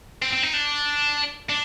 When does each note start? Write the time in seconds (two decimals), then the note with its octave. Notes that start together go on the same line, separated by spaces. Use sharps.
0.22 C4
0.33 C4
0.43 D#4
0.53 D4
1.49 D4